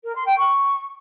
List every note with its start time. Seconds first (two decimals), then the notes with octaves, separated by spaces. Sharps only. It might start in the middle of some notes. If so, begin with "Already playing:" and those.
0.04 A#4
0.15 C6
0.26 G5
0.37 C#6